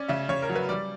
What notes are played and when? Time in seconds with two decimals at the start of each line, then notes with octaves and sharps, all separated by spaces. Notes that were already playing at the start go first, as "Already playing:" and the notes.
Already playing: C#4 D5
0.08 C#3 E5
0.29 C#3 C#5
0.42 A#4
0.49 F#3
0.55 B4
0.69 G3 D5